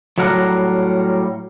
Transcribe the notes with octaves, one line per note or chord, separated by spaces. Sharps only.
A2 F#3 G3 A#4 F#5